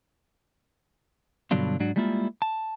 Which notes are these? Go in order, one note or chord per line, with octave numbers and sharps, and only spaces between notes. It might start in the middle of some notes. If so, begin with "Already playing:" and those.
G2 B2 D3 F#3 D4 F4
G#2 F#3 D4 F#4
G3 G#3 A#3 D4 E4 F4
A5